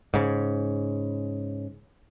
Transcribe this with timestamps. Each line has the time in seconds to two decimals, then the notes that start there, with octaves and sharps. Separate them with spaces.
0.14 G#2 C#3